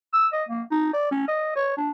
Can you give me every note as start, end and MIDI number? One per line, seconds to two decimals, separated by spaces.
0.14 0.27 88
0.33 0.44 75
0.48 0.62 58
0.71 0.89 63
0.93 1.08 74
1.11 1.27 61
1.28 1.52 75
1.56 1.74 73
1.77 1.91 62